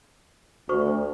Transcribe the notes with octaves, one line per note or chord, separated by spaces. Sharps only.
D2 F#4 C5 C#6